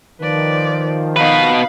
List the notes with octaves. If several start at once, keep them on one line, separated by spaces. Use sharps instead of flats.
D#3 F3 B4 D5
B2 D#4 B4 F5 B5